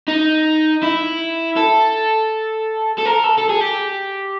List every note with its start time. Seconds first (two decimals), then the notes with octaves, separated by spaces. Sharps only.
0.08 D#4
0.83 E4
1.56 A4
2.98 A4
3.05 A#4
3.23 A4
3.38 A4
3.49 G#4
3.60 G4